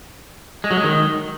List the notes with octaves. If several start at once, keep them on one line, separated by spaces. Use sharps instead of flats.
G#3
F#3
G#3
D#3